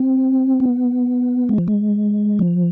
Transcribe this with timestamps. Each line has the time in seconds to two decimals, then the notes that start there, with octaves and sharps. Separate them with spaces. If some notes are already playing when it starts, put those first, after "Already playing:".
Already playing: C4
0.60 B3
1.49 G#3
1.58 F3
1.68 G#3
2.39 F3